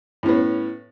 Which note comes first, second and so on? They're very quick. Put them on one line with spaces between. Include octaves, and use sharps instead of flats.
A2 C#4 B3